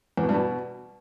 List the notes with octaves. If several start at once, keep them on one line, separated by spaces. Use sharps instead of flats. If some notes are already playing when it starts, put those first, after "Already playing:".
E2
B2
G2
B2